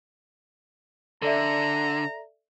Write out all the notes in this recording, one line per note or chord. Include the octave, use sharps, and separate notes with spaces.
D3 A4 D5 E5 A#5